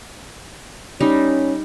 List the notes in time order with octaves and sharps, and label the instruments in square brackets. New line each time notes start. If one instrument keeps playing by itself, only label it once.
[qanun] G3 D#4 [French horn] C#4